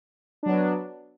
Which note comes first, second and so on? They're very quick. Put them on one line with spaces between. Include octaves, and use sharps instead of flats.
D4 F#3 B3